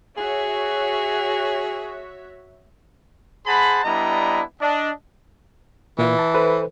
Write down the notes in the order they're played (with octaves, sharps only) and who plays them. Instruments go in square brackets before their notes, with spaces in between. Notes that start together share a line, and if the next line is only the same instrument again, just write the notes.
[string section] F#4 C#5 E5 [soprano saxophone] G#4
[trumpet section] G#4 C5 F#5 A5 B5
G3 B3 D4 E4 D#5 A#5
D4 D#5
[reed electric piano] A#2 F4 [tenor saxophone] E3
[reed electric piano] A5
A4 B4 C5